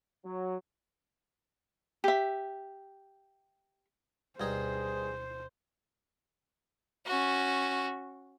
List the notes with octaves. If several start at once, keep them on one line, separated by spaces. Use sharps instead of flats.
F#3
G4 E5
D2 G2 B2 D#4 G#4 C5 G#6
C#4 F#4